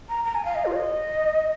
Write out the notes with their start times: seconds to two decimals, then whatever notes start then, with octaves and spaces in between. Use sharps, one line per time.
0.09 A#5
0.25 A#5
0.35 G#5
0.45 F5
0.55 D#5
0.66 F4
0.72 C#5
0.76 D#5